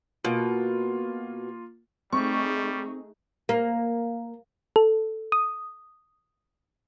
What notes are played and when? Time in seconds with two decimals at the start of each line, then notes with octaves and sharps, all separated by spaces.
0.24 B2 A#3 F4
2.13 G3 A3 C4 D#4 G#4 C#6
3.49 A#3
4.76 A4
5.32 D#6